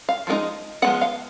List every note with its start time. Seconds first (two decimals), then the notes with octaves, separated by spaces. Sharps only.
0.09 F5
0.27 F3 G#3 B3 D#4
0.82 F3 G#3 B3 F#5
1.01 F5